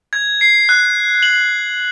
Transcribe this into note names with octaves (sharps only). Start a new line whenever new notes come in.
G#6
C7
F#6
F#7